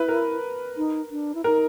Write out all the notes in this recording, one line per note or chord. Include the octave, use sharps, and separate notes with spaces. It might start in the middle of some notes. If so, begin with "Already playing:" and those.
Already playing: E4 B4
A#4
D#4
D4
E4
D#4 A#4